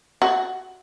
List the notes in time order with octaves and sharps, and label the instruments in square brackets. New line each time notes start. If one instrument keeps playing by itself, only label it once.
[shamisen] F#4